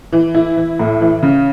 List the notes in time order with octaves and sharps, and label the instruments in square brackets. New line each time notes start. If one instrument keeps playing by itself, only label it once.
[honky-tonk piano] E3
E4
E3
A2
E3
C#3